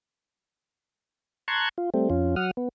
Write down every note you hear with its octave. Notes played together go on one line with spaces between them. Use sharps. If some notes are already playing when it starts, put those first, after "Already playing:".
A5 A#5 C6 C#6 F#6 G#6
F4
G3 A3 C4
F2 C#4 F4
F#3 F#5 D#6 F6
B3